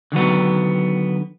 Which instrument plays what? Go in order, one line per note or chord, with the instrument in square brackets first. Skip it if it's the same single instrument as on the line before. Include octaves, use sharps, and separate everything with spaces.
[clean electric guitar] D3 D#3 F#3 B3